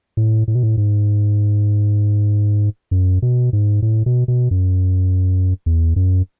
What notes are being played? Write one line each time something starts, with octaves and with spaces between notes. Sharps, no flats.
A2
A2
B2
A2
G#2
F#2
B2
G#2
A2
B2
B2
F#2
E2
F#2